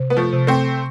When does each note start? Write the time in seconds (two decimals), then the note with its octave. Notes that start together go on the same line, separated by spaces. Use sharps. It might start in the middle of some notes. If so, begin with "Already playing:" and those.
Already playing: C3
0.10 B3
0.17 F3 A3
0.33 C3
0.47 A3 C4